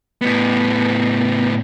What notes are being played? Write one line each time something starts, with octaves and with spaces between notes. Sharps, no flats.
A2 B3